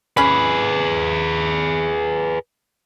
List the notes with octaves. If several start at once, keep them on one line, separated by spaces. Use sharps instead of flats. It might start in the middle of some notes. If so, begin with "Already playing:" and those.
C#4 G#4 B4 B5